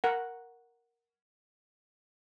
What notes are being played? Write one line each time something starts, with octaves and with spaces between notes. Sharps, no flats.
A#4 F#5